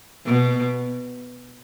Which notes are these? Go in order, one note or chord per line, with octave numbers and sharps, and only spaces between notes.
B2